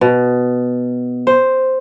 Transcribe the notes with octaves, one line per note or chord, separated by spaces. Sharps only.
B2
C5